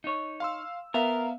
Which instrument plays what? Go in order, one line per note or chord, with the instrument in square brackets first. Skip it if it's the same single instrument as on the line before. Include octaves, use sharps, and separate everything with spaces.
[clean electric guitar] D#4 C#5
[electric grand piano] F5 C6 E6
[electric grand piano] B3 E5 F5 [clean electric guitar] A#4